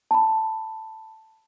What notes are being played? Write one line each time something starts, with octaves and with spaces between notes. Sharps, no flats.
A5 B5